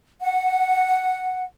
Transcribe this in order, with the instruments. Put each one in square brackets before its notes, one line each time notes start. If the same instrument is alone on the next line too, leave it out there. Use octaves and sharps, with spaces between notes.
[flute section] F#5